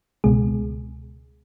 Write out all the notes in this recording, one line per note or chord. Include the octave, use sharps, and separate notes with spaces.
C#2 B2 G#3 G#4